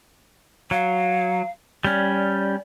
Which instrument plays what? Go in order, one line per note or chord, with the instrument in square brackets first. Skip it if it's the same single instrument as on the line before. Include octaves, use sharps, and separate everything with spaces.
[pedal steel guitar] F#3 [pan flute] F5
[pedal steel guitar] G3 C#4 [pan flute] D5